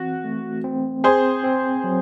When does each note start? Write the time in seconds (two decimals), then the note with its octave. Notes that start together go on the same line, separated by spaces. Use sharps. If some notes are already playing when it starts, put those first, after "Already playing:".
Already playing: E3 C4 F#4
0.24 A3
0.64 C4
1.04 C4 G#4 C5
1.44 C4
1.84 F#3